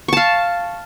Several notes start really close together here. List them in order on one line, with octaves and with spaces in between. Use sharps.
C#6 A5 F5